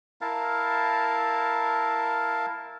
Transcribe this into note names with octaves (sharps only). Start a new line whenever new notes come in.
E4 A#4 F5 A5